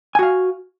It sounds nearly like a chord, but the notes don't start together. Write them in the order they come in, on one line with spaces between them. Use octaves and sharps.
G#5 F#4 F5